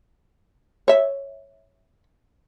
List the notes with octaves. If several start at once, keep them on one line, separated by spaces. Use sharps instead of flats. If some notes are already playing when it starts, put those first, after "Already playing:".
C#5 E5